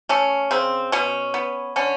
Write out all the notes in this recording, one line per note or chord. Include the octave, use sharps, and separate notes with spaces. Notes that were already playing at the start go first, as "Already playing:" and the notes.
A3 C#4
C#3 C4
B2 C#4
B3
D3 C#4